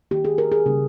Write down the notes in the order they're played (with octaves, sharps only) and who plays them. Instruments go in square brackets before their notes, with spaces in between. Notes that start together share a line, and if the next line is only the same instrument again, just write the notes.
[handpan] D#3 A#3 G4
G#4
A#4
G#4
C#3 G3 A#3